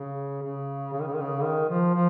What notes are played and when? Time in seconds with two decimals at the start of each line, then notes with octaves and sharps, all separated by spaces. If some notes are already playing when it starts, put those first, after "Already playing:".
Already playing: C#3
0.42 C#3
0.93 C#3
1.00 D#3
1.07 C#3
1.13 D#3
1.21 C#3
1.44 D#3
1.69 F3
1.94 F3